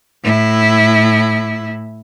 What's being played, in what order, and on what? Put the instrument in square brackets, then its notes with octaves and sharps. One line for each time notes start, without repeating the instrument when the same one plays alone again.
[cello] A2 E4